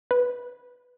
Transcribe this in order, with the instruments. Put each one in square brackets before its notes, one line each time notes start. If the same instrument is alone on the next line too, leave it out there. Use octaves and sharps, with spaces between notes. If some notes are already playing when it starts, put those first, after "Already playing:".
[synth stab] B4